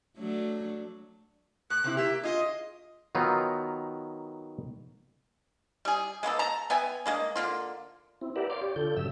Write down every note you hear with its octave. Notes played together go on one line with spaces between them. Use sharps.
F#3 A3 D4
A2 F#6
C3 C4 E4
A#3 G4 E5
F4 G#4 D#5
D#3 F#3 B3 D#4 F4
G3 G#4
G#3 A#3 B3 A4
A5 A#5
B3 E5 G5 G#5
G#3 A#3 D4
D3 A#3 F4
C4 E4
G4 A#4 B4 D5 E5 F#5
C#5 D5 F5 C6 D6
G4 C#5 D5
D3 F4 A4 G6
G2 C#3 F#3 E5 E6